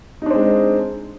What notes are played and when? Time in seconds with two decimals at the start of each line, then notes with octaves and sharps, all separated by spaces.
0.22 D#4
0.26 D4
0.31 C4
0.35 G#3